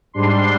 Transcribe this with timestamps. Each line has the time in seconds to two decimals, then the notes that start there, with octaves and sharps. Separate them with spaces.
0.13 G#2 G3 D4 C6